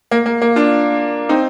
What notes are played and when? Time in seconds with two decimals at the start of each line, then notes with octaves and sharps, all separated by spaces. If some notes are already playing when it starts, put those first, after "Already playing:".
0.11 A#3
0.26 A#3
0.42 A#3
0.56 D4 F4
1.29 C4 D#4